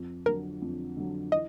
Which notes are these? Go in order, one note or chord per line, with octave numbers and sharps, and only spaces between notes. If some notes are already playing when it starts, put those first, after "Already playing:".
Already playing: F2
D3 F#3 A#4
F2
D3 F#3
E3 D#5